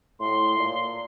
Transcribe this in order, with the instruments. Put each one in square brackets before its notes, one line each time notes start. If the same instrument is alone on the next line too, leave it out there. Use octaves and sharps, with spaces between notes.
[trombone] A2 [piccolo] C6
[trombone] A#2